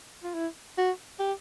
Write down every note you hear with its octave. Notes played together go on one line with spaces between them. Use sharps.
F4
E4
F#4
G4